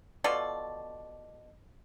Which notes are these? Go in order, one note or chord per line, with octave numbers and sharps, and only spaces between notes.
B2 F4 A4 D5